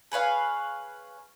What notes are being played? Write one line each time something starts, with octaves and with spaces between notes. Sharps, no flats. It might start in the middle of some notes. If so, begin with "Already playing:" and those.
G#4 B4 C#5 F5